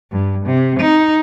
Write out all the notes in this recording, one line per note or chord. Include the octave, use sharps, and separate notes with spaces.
G2
C3
D#4